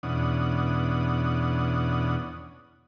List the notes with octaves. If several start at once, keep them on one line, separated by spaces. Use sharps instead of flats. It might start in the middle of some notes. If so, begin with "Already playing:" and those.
E2 B2 C#4 D4 F#5 D#6